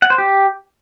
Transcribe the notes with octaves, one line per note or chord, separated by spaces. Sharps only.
F#5
C5
G4